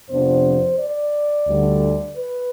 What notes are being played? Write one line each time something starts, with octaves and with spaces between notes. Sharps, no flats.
F2 C3 F3 B3 D4 C5
D5
D2 D3 G3
B4